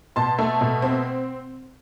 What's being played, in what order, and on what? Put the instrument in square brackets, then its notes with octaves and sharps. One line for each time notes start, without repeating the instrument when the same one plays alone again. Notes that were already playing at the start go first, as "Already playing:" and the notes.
[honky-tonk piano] B2 A5 C6
A3
B2
C4